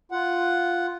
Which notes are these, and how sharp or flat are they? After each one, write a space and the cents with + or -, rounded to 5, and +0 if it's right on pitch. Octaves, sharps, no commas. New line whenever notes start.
F4 +0 F#5 +0